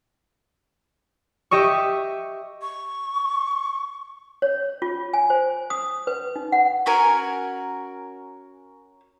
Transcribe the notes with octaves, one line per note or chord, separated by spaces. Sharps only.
G4 D#5 E5 C#6
C#6
C#5
F4
G#5
C5
D#6
B4
D#4
F#5
C#4 F#4 A#4 G#5